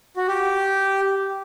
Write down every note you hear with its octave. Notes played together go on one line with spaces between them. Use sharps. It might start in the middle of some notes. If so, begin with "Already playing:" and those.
F#4
G4